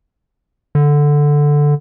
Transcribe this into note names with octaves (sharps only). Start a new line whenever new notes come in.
D3